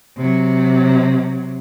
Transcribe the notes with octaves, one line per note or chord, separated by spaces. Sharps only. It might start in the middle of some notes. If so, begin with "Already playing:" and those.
C3 F#3